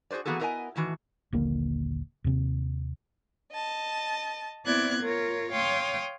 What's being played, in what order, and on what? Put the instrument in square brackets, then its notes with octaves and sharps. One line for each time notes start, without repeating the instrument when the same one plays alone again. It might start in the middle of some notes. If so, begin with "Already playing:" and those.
[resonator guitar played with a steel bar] F#4 G#4 B4 C5 D5
E3 A#3 B3 F#4 G#4 A4
B3 E4 A#4 C5 D#5 G#5
A2 D#3 E3 F#4
[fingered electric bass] D#1 A#1 D3 A#3
D#2 C3
[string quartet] D#5 A5
B3 C4 E4 D5 F#6 G#6
F4 A#4 C#5
C#5 F5 G5 C6 D#6